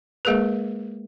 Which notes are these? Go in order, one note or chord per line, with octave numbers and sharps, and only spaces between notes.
G#3 A#3 G#4 A#4 B4